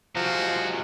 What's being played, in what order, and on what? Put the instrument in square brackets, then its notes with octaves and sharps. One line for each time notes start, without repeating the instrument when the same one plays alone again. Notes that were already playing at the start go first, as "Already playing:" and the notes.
[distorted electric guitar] C3 G#3 [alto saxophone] F3 [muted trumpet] F#4